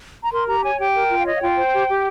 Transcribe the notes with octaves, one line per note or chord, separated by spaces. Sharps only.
A#5
A#4 C6
G4 A#5
C#5 G#5
G4 G5
A#4
F4
F5
C#5 D#5
F5
F4 G5
C5
G4
G4